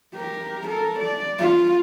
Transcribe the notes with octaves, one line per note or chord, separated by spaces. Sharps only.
G4 A#4
A4 A#4
D5
F4